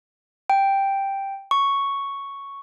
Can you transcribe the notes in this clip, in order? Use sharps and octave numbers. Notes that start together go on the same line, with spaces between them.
G5
C#6